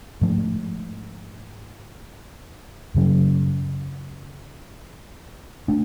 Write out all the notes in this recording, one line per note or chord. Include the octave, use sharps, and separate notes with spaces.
G#2 F3 A3
F#2 C#3 F#3 C#4
A3 D4